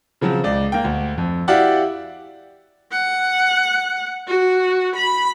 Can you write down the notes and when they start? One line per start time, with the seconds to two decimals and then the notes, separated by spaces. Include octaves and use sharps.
0.21 C#3 F3 F#3 C4
0.44 C#2 D5
0.72 A#3 G5
0.84 D2
1.17 F2
1.48 E4 F#4 G4 D5 F5 F#5
2.92 F#5
4.28 F#4
4.96 B5